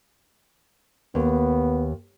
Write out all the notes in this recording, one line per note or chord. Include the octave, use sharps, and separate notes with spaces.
D#2 B3